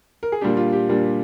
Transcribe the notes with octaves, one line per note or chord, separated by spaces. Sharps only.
A#4
G#4
A#2 G3 D4 G4
F4
G4
A#2 G3 D4